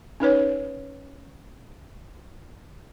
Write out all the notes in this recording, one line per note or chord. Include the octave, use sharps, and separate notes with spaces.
C#4 D#4 B4 C#5